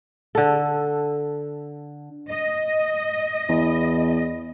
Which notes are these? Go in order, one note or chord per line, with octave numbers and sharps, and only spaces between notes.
D3 A4
D#5
E2